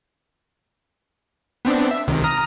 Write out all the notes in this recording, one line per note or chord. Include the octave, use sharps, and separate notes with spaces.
B3 C4 D4
E5
C#2 C3 D#3
A#5 D#6 F6